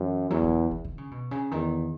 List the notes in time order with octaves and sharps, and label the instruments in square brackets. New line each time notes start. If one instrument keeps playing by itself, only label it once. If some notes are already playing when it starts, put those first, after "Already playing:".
Already playing: [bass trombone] F#2 [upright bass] E3
[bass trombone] E2 [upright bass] F#3
[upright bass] F#3
E3
D#3
C#3
B2
C#3
[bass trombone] E2 [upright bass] D#3